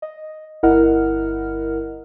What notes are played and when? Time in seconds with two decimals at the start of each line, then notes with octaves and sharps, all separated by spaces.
0.02 D#5
0.63 G1 E4 A#4 D#5 F#5 F6